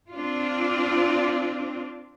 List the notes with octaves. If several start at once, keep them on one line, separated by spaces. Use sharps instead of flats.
C4 D4 F4